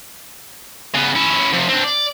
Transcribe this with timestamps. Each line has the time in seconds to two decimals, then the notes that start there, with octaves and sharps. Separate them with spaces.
0.95 C#3 B3
1.15 C#4 E4
1.53 F2 C3
1.69 C4 D4
1.84 D5